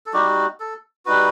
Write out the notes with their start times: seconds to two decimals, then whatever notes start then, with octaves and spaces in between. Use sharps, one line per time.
0.06 A4
0.13 G3 D#4 F#4 G4
0.60 A4
1.06 G3 D#4 F#4 B4